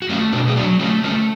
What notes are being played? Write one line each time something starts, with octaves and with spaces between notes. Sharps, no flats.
F#4
A3 C#4 F4
B2 D4 F#4
G#4
F#3 D4 F#4
A3 C#4 F4
A3 C#4 F4